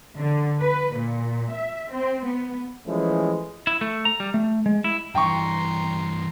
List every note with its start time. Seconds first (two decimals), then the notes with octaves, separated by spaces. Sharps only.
0.18 D3
0.62 B4
0.97 A#2
1.53 E5
1.92 C4
2.25 B3
2.87 E3 F3 G#3 A3 C#4
3.67 E4
3.81 A3
4.05 A#5
4.20 G3
4.34 A3
4.66 G#3
4.84 E4
5.15 G2 E3 G5 A#5 C6 C#6